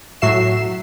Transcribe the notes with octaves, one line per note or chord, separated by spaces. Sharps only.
A2 F#3 F#4 E5 C7 E7